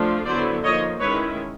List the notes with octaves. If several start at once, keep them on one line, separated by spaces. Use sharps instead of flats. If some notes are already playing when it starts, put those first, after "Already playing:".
Already playing: F3 A3 D4 F4
D3 F#3 B3 E4 C5 D5
F3 A#3 D#4 C#5 D#5
D#3 G#3 C#4 E4 B4 C#5